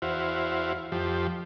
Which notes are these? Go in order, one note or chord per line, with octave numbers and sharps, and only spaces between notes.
E2 E4 F#4 C5 F5
F2 F3 G4